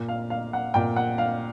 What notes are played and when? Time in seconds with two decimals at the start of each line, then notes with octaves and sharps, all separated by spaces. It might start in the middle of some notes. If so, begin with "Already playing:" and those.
Already playing: A#2
0.08 F5
0.30 F5
0.53 F#5
0.74 A#2 G5
0.96 F#5
1.18 F5